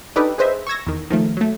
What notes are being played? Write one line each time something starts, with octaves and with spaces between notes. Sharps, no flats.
D4 D#4 G4 A4 B4
G#4 B4 C5 D#5 E5
C#6 E6 G#6 A#6
E2 D#3
D#3 F3 A3
F#3 A3